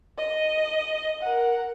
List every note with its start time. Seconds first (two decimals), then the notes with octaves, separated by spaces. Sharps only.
0.18 D#5
1.22 A#4 F#5